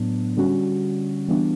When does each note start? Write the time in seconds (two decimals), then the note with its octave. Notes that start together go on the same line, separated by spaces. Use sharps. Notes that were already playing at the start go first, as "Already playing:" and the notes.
Already playing: A2 F#3 B3 D4
0.36 D3 G3 C#4 F#4
1.28 E3 G3 B3 D4 F#4